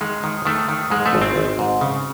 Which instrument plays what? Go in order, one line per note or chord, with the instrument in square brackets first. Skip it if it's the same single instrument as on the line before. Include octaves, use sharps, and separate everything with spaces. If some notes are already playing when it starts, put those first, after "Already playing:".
[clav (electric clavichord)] D#3 G#3
D#3
D#3 A3
D#3
G#2 G#3
A3
G#1
C4
G#1
G#2
C#3